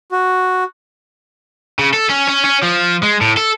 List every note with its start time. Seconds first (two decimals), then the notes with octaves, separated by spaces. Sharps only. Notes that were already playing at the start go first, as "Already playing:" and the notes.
0.12 F#4
1.79 C#3
1.94 A4
2.10 C#4
2.29 C#4
2.45 C#4
2.63 F3
3.03 G#3
3.21 A2
3.37 A4